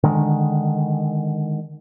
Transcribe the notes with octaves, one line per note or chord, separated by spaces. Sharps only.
D3 D#3 G#3